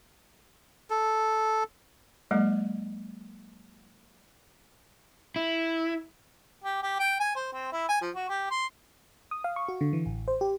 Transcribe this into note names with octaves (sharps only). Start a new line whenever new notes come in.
A4
F#3 G#3 A#3 D#5
E4
G4
G4
G5
G#5
C5
C4
E4
G#5
F3
F#4
G4
C6
D#6
F5
C#6
F#4
D3
E3
A1
C5
G4